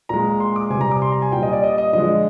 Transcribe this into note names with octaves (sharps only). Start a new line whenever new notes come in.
A#2 G#3 A#5
C6
D6
C3 G3 G#5
A#5
D6
C6
A#5
G#5
A#2 G3 G5
D#5
D5
D#5
D#5
D3 F3 G#3 D#5